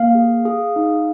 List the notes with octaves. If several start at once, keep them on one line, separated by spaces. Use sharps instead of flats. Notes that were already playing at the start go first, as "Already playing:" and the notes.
Already playing: A#3 F5
G#4
G#4
D#4